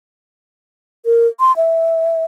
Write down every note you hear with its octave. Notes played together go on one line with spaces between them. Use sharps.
A#4
C6
E5